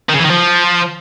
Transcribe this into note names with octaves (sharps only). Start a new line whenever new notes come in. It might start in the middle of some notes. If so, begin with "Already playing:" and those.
D#3
C#3
E3
D#3
F3